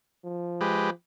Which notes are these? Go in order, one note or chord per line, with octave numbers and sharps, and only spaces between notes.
F3
G#3 G4 B4